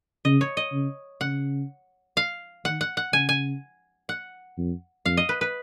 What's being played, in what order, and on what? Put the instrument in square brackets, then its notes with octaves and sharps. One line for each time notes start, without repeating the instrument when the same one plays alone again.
[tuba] C#3 [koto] D#5
[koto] C#5
D#5
[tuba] C#3
[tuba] C#3 [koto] F#5
[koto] F5
[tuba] D#3 [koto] F#5
[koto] F#5
F#5
[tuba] C#3 [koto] G#5
[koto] G#5
F#5
[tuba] F2
[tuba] F2 [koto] F5
[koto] D#5
B4
B4